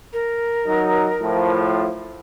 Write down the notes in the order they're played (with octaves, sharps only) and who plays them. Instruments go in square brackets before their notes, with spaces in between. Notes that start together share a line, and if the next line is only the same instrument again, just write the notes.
[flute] A#4
[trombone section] F#3 D#4
A2 F3